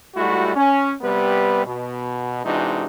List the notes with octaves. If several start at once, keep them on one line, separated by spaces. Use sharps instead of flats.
G#2 G3 A3 E4 F#4
C#4
C3 G3 B3 B4
B2
C3 E3 G#3 D4 D#4 F#4